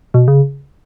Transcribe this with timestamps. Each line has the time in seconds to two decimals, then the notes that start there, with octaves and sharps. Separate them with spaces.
0.14 B2
0.28 C#3